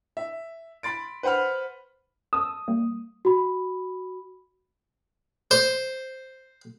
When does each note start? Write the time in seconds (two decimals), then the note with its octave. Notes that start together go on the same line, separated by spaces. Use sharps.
0.17 E5
0.83 B5 C6 A6 D7
1.23 B4 C5 F#5 B5 F6
2.33 A5 D#6 E6
2.68 G3 A#3
3.25 F#4 B5
5.51 C5